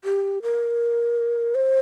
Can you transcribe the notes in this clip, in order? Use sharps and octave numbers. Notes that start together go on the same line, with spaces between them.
G4
A#4
C5